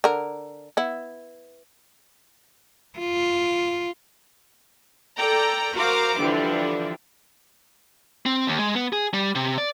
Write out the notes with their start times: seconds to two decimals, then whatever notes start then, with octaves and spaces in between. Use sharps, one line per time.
0.04 D3 A#4
0.77 B3 E4
2.99 F4
5.17 A4 D5 G5 A#5
5.74 F#4 A#4 C5 F5 A#5 D6
6.20 D3 E3 F3 G3 D4
8.26 C4
8.47 D#2
8.59 G#3
8.75 B3
8.93 G#4
9.14 G3
9.35 C3
9.58 D5